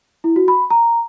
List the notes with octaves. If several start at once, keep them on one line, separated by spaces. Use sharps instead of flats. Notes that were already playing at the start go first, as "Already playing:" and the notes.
E4
F#4
B5
A#5